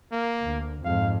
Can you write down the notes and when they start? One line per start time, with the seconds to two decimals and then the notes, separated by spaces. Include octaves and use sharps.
0.12 A#3
0.44 D2
0.85 F2 G#2 F3 F5